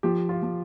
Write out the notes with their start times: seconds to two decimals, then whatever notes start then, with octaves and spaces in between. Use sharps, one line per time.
0.03 F3 G4
0.29 F4
0.43 F3